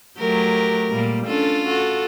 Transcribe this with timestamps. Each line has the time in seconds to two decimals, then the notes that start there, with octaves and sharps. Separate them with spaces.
0.19 F#3 A3 G4 A#4
0.89 A#2 G3 A#3
1.27 C#4 D4 F4 A4
1.67 F#4 A4